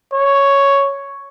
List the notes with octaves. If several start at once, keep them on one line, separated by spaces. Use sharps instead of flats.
C#5